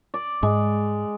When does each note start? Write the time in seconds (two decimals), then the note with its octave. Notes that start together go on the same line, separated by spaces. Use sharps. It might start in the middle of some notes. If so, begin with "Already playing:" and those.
0.14 D5
0.43 G#2 G#3